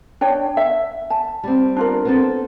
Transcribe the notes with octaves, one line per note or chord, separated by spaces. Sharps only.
D4 C#5 G5
E5
A5
G3 C4
D4 F4 A#4
B3 C4 A4